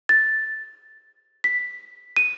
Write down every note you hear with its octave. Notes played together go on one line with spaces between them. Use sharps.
A6
B6
D#7